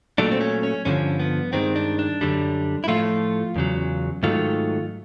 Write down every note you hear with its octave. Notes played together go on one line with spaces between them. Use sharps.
A#2 F#3 A3 D4
C4
C#4
C#4
G2 D3 F3 C#4
B3
G2 D#3 G#3 C4
D4
D4
F#2 D3 G3
E4
A2 F3 A3 F4
E2 C#3 F#3
G#2 D#3 F#3 A3 F4